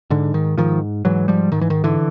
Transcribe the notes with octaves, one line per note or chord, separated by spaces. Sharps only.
G#2 D3
D#3
G#2 D#3 F3
G#2 E3 F#3
F3 G3
G#2 D#3
E3
D#3
D3 E3